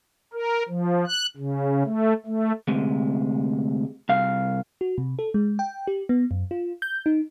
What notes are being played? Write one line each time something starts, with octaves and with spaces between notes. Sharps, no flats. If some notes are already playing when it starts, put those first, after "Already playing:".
A#4
F3
F#6
C#3
A3
A3
D2 C3 G#3
C2 F5
F#4
C3
A4
G#3
G5
G4
B3
F#2
F4
G6
D#4